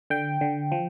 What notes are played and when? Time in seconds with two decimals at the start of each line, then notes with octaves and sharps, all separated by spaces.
0.10 D3 G5
0.41 D3
0.72 F3